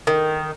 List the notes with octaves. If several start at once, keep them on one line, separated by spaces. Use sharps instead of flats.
D#3